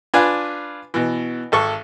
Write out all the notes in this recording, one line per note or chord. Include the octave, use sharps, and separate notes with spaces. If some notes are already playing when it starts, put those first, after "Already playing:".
D4 F4 B4 G#5
B2 E3
G#1 A4 C#6